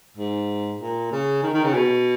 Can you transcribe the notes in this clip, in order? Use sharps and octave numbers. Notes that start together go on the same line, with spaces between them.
G#2
A#2
C#3
D#3
D#3
C#3
B2